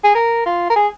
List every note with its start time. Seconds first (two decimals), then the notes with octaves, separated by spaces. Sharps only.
0.04 G#4
0.15 A#4
0.46 F4
0.70 A#4
0.76 G#4